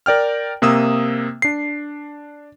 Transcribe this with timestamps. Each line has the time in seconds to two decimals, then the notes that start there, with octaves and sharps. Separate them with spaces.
0.06 A#4 D5 G5 F6
0.62 C3 A#3 D#6 E6
1.42 D4 C7